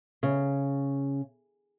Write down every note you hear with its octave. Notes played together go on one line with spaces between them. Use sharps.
C#3